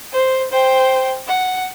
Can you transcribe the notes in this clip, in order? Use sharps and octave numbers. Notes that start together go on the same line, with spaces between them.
C5
C5 G5
F#5